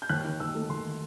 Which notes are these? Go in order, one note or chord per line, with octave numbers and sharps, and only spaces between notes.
G6
D#2 F#6
D#3
D#2 E6
A3
D#2 C6
D#3